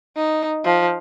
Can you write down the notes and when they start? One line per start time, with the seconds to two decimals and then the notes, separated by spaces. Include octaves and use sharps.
0.16 D#4
0.64 F3